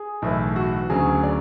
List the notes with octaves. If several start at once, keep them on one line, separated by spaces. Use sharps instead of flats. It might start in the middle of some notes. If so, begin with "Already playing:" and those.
Already playing: G#4
B1 A2 E3
F#4
D2 C#3 F#3 G#4
D5